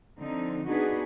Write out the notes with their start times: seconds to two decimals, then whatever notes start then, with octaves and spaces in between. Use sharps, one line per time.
0.21 D3 F3 C4 D#4
0.68 B3 D4 D#4 F#4 G#4 B4